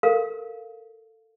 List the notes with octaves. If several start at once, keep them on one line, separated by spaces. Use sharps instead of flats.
A4 A#4 F5